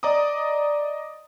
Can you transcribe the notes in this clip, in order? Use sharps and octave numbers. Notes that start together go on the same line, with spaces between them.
D5 D#5 A#5 D6 D#6